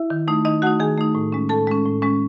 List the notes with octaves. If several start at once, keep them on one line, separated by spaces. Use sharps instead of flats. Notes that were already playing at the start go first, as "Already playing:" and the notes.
Already playing: E4 E5
D#3
A3 D#4
D#3 D#4 D#5
A3 D#4 F#4 F#5
D#3 G#4 G#5
A3 D#4
A2
G#3 C#4
A2 A4 A5
G#3 C#4
A2
G#3 C#4